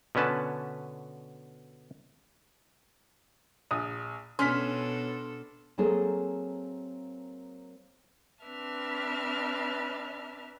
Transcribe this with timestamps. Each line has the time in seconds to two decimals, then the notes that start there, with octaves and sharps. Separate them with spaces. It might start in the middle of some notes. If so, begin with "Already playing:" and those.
0.15 B2 D3 C#4 B4 A5
3.71 A#1 D#6
4.39 B2 C#4 D4 A4 C6 F6 B6
5.78 F#3 A#3 C4 G#4 A4 C5
8.43 C4 D4 B4 E5 A5 F6